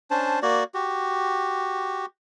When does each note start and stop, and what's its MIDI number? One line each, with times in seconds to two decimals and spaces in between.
0.11 0.40 61
0.11 0.40 62
0.11 0.40 72
0.11 0.40 81
0.42 0.64 58
0.42 0.64 66
0.42 0.64 74
0.74 2.06 66
0.74 2.06 67